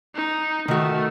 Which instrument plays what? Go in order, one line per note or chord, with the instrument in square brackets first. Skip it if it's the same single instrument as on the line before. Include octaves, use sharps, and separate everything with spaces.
[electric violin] D#4
[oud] D#3 F#4 [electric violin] A3